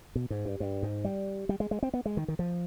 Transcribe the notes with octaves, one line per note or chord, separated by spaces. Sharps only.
B2
G#2
G2
G2
G#2
G3
G3
G#3
G#3
C4
B3
G#3
D#3
D#3
F3